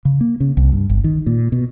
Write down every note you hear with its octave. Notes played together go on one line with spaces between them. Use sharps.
C#3
A#3
C#3
C2
G2
G1
D#3
A#2
B2